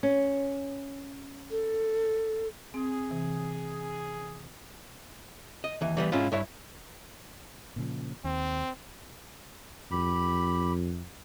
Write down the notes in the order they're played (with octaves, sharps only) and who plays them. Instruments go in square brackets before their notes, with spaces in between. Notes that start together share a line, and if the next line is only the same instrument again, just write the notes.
[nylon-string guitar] C#4
[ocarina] A4
[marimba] C4 [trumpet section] G#4
[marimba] C3 E3
[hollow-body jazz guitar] D#5
D#2 E3
E3 G3 B3
G#2 C#4 E4 F4
G2 E4 C#5
[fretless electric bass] A#2 C#3 F3
[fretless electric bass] D#2 [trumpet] C4
[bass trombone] F2 [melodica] G4 B5